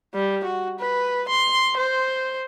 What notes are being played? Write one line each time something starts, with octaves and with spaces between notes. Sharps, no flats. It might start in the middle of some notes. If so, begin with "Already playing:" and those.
G3
F#4
B4
C6
C5